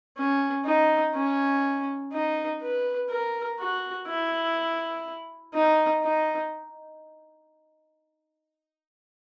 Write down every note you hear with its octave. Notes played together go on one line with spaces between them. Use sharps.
C#4
D#4
C#4
D#4
B4
A#4
F#4
E4
D#4
D#4